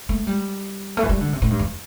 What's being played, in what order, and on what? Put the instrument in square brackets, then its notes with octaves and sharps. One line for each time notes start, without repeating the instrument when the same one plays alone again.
[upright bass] A3
G3
A3
E3
G3
D3
C3
A2
G2
E2